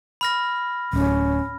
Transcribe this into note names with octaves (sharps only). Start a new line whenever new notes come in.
B5 F6 A#6
D1 C#4